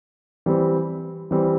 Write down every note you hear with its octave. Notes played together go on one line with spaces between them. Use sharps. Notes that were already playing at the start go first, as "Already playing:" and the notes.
E3 G3 C4
E3 G3 C4